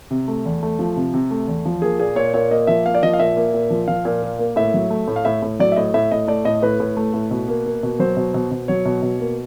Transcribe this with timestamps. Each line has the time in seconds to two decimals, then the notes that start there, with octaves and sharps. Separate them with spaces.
0.11 C3
0.28 A3
0.45 E2
0.63 A3
0.79 F3
0.96 C3
1.14 C3
1.31 A3
1.48 E2
1.65 F3
1.82 A#3 G#4
1.99 A#2 G#4
2.16 A#2 C#5
2.34 A#2 C#5
2.51 A#3 D#5
2.67 F3 E5
2.86 A#3 F5
2.95 D5
3.03 F3 D#5
3.13 F5
3.19 A#2 E5
3.37 A#3
3.54 A#2
3.70 F3
3.88 F3 F5
4.05 A#2
4.22 A#3
4.39 A#3
4.56 A2 E5
4.74 F#3
4.90 A3
5.08 A2
5.16 F5
5.25 A2 E5
5.42 A2
5.60 F#3 D5
5.72 E5
5.76 A2 D#5
5.94 A2 E5
6.11 A2 D#5
6.28 A3 D5
6.45 A2 D#5
6.62 A2 B4
6.80 A2
6.97 A3
7.14 A2
7.31 B2
7.48 A#3
7.66 A#3
7.83 B2
7.99 F#3 C5
8.17 B2
8.34 B2
8.51 B2
8.68 F#3 C#5
8.85 B2
9.02 B2
9.20 A#3